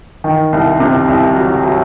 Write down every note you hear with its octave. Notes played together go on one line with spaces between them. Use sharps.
D#3
C2
C3
C2
F#3
F#3